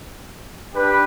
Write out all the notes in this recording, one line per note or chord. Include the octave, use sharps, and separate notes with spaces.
D4 G4 B4